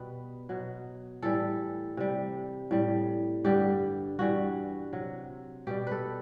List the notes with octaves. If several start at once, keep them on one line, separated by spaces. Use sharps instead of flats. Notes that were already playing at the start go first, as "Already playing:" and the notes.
Already playing: B2 G3 B4
B2 F#3
A2 E3 G3 A4
C3 G3
A2 G3
G2 D3 G3 G4
G2 E3 G3 F#4
C3 F#3
B2 G3 G4
A4 B4